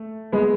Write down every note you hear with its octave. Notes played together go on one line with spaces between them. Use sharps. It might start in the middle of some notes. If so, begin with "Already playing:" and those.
Already playing: A3
G#3 B3